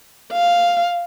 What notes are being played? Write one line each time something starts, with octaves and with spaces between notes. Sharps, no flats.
F5